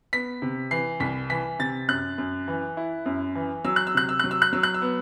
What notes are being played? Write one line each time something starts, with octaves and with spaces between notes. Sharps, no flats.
B3 B6
C3
E3 C7
C2 B6
E3 B6
C3 A6
F#2 F#6
F#2
E3
E4
F#2
E3
F#3 E6
F#6
E6
C3 F#6
E6
F#3 F#6
E6
F#6
F#3 E6
F#6
E6
B3